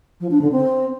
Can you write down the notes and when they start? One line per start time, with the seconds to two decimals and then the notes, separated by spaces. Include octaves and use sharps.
0.20 F3
0.31 D4
0.41 D3
0.52 C4